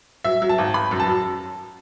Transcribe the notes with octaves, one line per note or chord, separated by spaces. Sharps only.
F#3 E5
F#3
A5
G#1
G#1 B5
F#2
A5
F#3